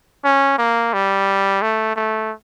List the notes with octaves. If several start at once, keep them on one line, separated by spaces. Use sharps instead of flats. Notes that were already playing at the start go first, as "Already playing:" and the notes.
C#4
A#3
G3
A3
A3